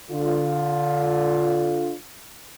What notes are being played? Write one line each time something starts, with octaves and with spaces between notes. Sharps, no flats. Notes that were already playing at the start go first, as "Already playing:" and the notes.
D3 F4